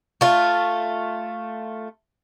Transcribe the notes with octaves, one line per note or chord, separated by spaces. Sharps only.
A3 F4